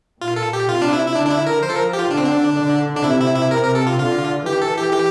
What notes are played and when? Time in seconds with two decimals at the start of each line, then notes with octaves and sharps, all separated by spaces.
0.21 A#2 F4
0.36 A4
0.53 G4
0.69 C3 F4
0.82 D4
0.93 E4
1.06 E4
1.15 D3 D4
1.26 D4
1.31 E4
1.47 A#4
1.63 F3 C5
1.70 A4
1.75 A#4
1.93 G4
1.99 F4
2.11 D3 D4
2.18 C4
2.25 D4
2.57 D3
2.96 D4
3.04 C3 E4
3.21 E4
3.35 E4
3.51 C3 A#4
3.63 A#4
3.75 A4
3.87 F4
3.99 D3 F4
4.46 E3 G4
4.61 A4
4.77 G4
4.93 G4